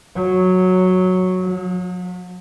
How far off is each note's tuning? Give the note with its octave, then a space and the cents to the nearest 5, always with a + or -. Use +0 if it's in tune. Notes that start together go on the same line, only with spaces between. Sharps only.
F#3 -5
F#3 -45